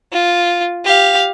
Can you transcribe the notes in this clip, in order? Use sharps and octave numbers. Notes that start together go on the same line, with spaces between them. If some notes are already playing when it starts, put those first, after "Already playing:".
F4
G4 F5